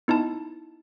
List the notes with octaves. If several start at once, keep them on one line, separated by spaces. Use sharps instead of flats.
B3 D#4 E4 A5